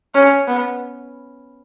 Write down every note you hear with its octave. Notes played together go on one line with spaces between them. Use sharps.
C#4
B3